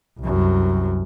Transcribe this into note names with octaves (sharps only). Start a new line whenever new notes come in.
C2 F#2